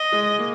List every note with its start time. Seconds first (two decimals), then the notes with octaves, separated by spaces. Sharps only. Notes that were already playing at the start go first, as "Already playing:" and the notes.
Already playing: D#5
0.12 G#3
0.39 A#3